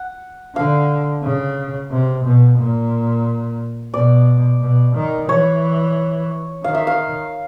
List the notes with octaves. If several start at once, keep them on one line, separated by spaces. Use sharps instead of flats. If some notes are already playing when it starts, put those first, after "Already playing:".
Already playing: F#5
D3 F5
C#3
C3
B2
A#2
B2 D5
B2
D#3
E3 C#5
D#3 F5
E5
F5